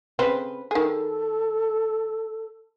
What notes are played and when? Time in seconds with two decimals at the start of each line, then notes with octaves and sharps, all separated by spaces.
0.19 C#3 C4 B4
0.71 D#3 G#4 A4